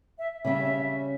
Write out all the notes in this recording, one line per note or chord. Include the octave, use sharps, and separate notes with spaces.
E5
C#3 G3 C#4 E5